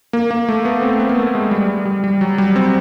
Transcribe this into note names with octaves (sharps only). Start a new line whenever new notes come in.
A#3
A#3
A3
B3
C4
B3
A#3
A3
G#3
G3
G3
G3
G3
F#3
G3
C4